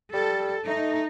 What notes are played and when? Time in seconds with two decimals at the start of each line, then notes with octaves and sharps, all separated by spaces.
0.13 G3 A4
0.67 A3 D#4